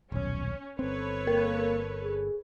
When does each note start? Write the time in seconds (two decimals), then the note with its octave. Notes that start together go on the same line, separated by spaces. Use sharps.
0.12 D#1 B1 C#4
0.79 G1 C4 A4 B4 C#5
1.27 A#3 A#4
2.03 G#4